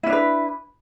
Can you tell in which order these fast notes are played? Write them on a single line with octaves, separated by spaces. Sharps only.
E4 C#4 D4 B4